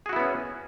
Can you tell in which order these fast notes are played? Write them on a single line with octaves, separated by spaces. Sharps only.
G#4 F#4 E4 B3 C#4